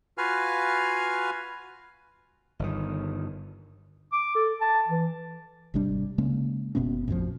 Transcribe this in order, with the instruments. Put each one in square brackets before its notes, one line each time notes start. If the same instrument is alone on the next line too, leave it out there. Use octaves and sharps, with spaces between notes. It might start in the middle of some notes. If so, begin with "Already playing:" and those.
[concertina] F4 F#4 B4 F5 G#5 F6
[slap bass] G1 D#3
[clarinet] D6
A4
A5
E3
[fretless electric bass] G#1 C3 G3 D4
C#3 G#3 A#3 C#4
F#1 B2 B3 C#4
A1 F2 B2 F3